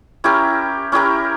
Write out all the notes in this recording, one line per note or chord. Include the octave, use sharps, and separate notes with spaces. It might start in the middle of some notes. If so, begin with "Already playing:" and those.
C#4 E4 G4 A#4
C#4 E4 G4 A#4